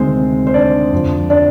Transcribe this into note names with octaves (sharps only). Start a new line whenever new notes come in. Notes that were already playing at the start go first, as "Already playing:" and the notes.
Already playing: D2 C3 D#3 G#3 C4 G#4 C5
C5
D4 D5
F2 D3 F3
D4 D5